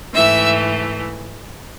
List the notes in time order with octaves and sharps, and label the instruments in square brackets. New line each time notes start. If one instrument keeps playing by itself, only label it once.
[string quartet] G#2 E3 A3 E5